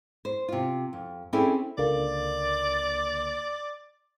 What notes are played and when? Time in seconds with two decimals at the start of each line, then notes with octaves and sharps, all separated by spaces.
0.25 C5
0.49 C3 F4
0.93 F2
1.33 C4 C#4 E4 G#4 A4 D5
1.78 C#2 D3 A#3 D5